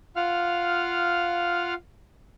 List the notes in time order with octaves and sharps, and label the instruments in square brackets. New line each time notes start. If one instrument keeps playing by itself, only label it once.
[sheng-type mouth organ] F4 F5 F#5 F6